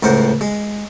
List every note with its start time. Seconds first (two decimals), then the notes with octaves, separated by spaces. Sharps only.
0.03 C#2 A2 A#4 C5 F#5
0.41 G#3